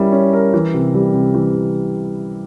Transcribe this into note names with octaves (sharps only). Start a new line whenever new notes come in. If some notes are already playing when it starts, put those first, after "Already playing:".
Already playing: G3 C#4 E4 A#4
C#4
A#4
E3
C3
G3
C3
E3
C3